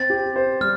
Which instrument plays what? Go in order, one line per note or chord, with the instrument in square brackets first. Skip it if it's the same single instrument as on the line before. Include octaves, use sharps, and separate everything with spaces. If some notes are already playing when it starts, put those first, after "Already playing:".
Already playing: [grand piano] C4 [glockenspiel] A6
[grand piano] G4
C5
[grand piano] G3 [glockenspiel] F6